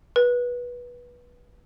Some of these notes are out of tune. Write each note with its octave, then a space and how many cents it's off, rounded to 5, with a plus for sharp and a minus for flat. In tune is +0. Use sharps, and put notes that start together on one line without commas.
B4 -20